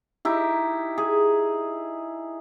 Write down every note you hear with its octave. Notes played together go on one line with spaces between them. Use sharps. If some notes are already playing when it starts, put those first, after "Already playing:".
D#4 E4 G4
G#4